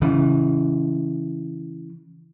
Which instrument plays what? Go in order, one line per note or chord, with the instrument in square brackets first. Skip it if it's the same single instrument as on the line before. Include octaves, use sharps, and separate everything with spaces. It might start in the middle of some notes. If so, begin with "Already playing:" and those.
[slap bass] C#3 E3